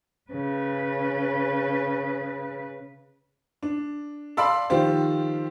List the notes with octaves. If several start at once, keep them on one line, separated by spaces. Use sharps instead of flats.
C#3 B4
D4
D5 F5 A5 B5 C6 E6
D#3 F3 F4 G4 C5